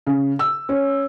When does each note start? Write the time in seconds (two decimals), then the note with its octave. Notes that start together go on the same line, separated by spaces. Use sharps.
0.07 C#3
0.39 E6
0.69 C#4